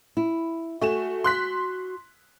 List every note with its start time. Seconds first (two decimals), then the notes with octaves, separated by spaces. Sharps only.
0.17 E4
0.81 A3 F#4 G#5 E7
1.24 C6 F#6 B6